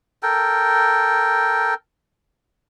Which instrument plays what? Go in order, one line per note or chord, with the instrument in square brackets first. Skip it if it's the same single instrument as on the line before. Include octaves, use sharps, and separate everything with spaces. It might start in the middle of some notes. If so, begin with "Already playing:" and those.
[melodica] A4 A#4 G5